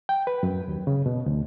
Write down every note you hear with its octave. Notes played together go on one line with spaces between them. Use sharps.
G5
B4
F#2
D#2
C#3
B2
D2